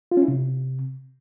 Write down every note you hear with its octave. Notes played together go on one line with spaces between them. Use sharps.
F4
C#4
E4
C3